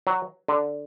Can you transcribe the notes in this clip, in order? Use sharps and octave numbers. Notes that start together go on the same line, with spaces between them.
F#3
D3